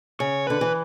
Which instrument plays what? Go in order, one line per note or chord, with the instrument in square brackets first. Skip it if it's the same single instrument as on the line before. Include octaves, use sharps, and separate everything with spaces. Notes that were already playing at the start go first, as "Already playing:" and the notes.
[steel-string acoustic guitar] C#3 [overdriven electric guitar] C#5
[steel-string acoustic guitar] D3 [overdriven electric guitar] B4
[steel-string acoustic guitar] E3